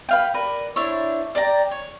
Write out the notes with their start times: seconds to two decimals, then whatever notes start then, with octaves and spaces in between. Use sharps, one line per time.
0.09 B4 F5 G5
0.34 A#4 B4 D5
0.76 D4 E4 C5 C#5
1.35 D5 G5 A#5
1.71 C#5